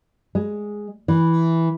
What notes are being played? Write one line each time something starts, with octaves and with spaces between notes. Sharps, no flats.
G#3
E3